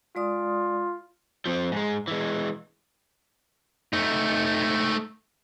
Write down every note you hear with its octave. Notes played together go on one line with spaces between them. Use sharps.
G#3 F4 D5 D#6
F3 C4
G#2 G#3
E3 G#3
A3 D#4